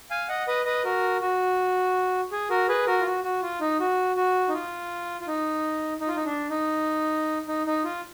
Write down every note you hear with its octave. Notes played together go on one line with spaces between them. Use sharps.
F5 G#5
D#5 F#5
B4 D#5
B4 D#5
F#4 A#4
F#4
G#4
F#4 A#4
G#4 B4
F#4 A#4
F4
F#4
F#4
F4
D#4
F#4
F#4
D#4
F4
F4
D#4
D#4
F4
D#4
D4
D#4
D#4
D#4
F4